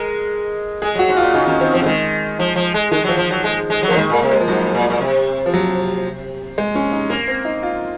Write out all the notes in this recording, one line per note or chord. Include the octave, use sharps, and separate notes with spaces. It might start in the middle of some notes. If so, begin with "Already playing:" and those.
Already playing: G#3 A#4
G#3 G#4
F#3 F#4
G#2
F4
A#2
C#3 D#4
D#3 C#4
D#3 C4
F3 C4
C#3
D#3 G#3
F3
F3
G#3
D#3 G#3
F3 F#3
F3
F#3
G#3
G#3
F#3
F3 A#3
D#3 G#3
A#2 A#3
C3
G#3
F3
G#2 F#3
A#2
A#2
C3
F3
F#3
G#3
C#4
D#4
A#3 C#4
C4
D#4
F4